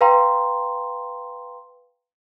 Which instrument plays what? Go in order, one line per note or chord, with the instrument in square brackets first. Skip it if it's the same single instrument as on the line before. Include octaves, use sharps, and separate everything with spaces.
[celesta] B4 F5 G5 A#5 C6